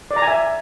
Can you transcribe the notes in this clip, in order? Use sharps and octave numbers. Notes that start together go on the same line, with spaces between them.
D5
A#5
G#5
E5